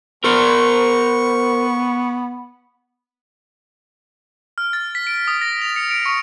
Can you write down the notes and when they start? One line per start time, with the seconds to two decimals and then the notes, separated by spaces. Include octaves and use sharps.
0.25 B3 A#4 C5 C#6
4.58 F6
4.73 A6
4.95 B6
5.07 D7
5.28 D#6
5.41 A#6
5.62 F7
5.76 C#7
5.91 D7
6.06 C#6